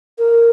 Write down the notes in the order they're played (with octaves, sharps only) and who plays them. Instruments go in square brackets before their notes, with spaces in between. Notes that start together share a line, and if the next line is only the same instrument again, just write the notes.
[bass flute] A#4